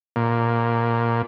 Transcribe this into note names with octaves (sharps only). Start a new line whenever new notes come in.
A#2